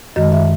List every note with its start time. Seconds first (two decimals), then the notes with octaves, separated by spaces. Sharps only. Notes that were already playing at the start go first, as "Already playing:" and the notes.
0.16 F#2 D#3 G#3 D#5
0.32 E5